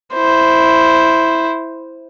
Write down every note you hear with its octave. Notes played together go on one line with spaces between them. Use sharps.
E4 C5